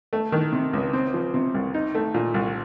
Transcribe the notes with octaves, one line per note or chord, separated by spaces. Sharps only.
A3
D#3
C3
C#2
C4
F3
C3
C2
D#4
A3
A#2
C2